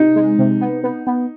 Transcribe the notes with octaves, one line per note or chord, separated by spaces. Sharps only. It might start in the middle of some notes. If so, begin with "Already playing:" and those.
Already playing: C3 D#4
G#3
C3
B3
B3
B3